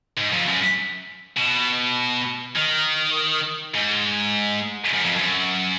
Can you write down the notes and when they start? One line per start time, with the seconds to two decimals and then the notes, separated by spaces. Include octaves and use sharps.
0.18 G#2
0.33 F2
0.47 F#2
1.37 B2
2.56 D#3
3.74 G#2
4.93 F#2
5.05 F2
5.17 F#2